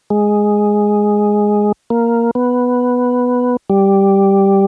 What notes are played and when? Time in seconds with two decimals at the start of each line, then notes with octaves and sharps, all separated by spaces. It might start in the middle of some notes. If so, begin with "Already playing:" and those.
0.10 G#3
1.90 A#3
2.35 B3
3.70 G3